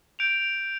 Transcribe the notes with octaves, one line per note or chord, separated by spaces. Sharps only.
G6 D7 F7